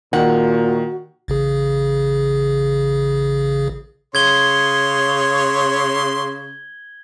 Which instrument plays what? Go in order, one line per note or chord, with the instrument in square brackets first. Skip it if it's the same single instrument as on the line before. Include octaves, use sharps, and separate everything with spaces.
[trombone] A#2 [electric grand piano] D#3 [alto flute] F#4 [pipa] F#5
[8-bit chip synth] A1 C#3 G#4
[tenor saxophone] C#3 [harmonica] C#5 C6 [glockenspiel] G#6 G7